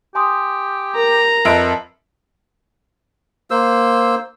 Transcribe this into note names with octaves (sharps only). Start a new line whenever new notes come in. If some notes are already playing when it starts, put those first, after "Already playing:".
G4 G#5 C6 D#6
A#4 A#5
F2 B4 E5 D7
A#3 C5 E6